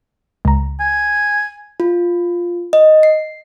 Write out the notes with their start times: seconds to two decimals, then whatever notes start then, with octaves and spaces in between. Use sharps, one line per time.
0.45 C#2 A#5
0.80 G#5
1.80 F4
2.73 D#5
3.03 C7